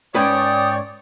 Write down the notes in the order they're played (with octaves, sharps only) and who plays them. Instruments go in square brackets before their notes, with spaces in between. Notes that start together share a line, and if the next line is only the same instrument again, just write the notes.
[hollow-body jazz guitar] G#2 C#4 B4 [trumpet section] C#5 D5 [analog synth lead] G5 [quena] D#6